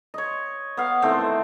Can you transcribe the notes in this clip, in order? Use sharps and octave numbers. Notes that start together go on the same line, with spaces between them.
C#5 D#5
B3 F5
D#3 E3 A3 C4